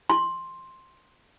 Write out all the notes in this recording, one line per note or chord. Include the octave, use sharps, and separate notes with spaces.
C6